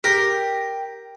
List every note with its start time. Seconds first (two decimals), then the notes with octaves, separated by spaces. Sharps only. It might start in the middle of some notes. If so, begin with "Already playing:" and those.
0.04 G4 A#4